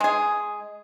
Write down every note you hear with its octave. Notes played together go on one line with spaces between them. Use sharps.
G#3 G#4